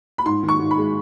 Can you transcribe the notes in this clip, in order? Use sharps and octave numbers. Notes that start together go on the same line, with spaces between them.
B5
G#2 C6
D#3
C#6
G#2
B5
G#3